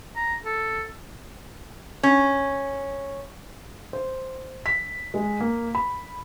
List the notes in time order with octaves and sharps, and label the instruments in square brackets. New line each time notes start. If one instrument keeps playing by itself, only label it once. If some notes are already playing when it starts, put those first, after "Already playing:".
[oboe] A#5
A4
[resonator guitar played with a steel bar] C#4
[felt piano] C5
B6
G#3
A#3
B5